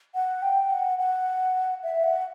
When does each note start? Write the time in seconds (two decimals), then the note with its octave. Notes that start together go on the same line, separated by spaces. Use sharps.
0.15 F#5
0.42 G5
0.70 F#5
0.98 F#5
1.83 E5
2.04 F#5